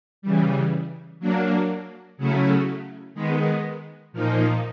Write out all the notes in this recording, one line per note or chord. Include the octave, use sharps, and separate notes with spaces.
C#3 E3 G3
F#3 A#3 D4
C#3 F#3 A3 C#4 E4
D#3 G#3 B3
A#2 F3 A#3 D#4